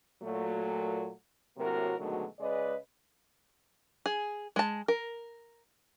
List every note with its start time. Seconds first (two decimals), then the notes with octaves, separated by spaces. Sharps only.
0.22 A#2 F#3 A3
1.58 A2 C3 F#3 A#3 F#4 A#4
1.99 B2 D3 D#3 F#3 G#3 A3
2.39 C#3 G#3 B4 D5 D#5
4.06 G#4
4.56 G#3 A5
4.88 A#4